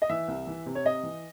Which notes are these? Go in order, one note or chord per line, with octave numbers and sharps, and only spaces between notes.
D#5
E3 E5
C2
E3
C3
C#5
C3 D#5
E3